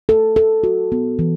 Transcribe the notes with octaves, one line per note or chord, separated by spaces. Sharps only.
A4
A4
F#4
B3
E3